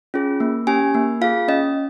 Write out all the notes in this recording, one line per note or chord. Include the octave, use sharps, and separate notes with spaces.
C#4 F4 G#4
A#3
C#4 G4 G#5
A#3
F4 G#4 F5
C#4 D#5